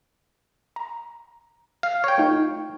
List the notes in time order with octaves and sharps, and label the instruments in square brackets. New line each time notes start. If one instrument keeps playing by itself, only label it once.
[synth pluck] A#5
[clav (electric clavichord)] F5
C#5 G5
[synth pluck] A3 D#4 F4